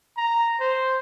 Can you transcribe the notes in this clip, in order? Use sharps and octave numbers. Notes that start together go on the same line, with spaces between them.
A#5
C5